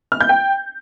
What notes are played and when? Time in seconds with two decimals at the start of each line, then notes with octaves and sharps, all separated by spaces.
0.12 F6
0.21 G6
0.29 G5